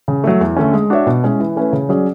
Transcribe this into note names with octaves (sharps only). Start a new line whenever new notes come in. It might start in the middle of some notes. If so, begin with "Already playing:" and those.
C#3
F#3 A3
E2
D3 A3 C#4
G#3
D4 F#4 C#5 E5
B2
G#3 C#4 E4
E3
A3 C#4 E4 B4
C#3
F#3 C#4 G#4 D5